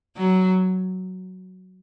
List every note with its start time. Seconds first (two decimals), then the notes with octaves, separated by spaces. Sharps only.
0.17 F#3